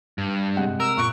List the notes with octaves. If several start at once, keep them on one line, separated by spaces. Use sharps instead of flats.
G2
C3 G#3 F#5
A#4 E6
A#2 C#6 F#6 D7